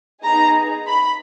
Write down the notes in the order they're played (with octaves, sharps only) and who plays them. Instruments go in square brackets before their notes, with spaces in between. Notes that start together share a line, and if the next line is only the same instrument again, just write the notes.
[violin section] B3 D#4 G#4 A#5
B5